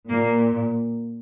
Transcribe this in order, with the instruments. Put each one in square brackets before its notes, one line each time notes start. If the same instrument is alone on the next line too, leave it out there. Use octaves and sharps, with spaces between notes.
[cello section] A#2 [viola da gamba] A#3